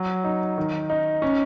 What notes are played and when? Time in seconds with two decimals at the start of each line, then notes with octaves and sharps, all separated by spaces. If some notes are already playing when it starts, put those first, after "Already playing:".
Already playing: F#3
0.24 D#4
0.58 D#3
0.90 D#4
1.22 C#4